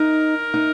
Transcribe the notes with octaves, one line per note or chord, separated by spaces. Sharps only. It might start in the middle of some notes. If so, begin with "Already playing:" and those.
Already playing: D#4 A#4
D#4